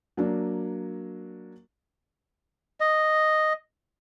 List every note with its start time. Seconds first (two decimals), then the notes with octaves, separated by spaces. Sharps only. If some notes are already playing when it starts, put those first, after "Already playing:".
0.17 F#3 A#3 D4
2.80 D#5